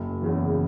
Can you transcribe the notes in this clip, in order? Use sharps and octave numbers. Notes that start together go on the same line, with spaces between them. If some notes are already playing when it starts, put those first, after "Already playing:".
Already playing: F#1
E2 C#3 E3